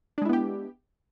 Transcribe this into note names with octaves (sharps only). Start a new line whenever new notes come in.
G#3 B3 D4 E4 G4